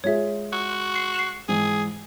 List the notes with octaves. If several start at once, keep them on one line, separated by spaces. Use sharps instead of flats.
G#3 F4 G#4 C#5 E5
F#4
C7
C7 E7
G#2 E3 G#4